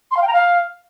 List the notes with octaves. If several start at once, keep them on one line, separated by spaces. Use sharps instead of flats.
C6
F5
G5
A#5
F5